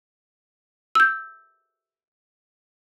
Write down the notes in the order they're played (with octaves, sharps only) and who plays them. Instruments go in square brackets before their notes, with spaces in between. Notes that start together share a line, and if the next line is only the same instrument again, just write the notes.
[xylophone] E6 G6